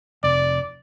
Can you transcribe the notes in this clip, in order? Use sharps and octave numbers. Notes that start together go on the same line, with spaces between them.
F1 D5